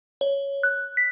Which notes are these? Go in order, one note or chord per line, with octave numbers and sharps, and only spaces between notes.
C#5
F#6
B6